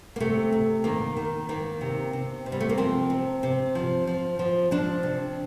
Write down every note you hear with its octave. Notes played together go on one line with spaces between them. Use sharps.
A#3
C3 A3
C3
D#3 A#3
D#3
D#3 A#3
C3
C3
C3
G3
A3
A#3
F3 C4
C3
C3
F3
F3
F3
F3 D4
C3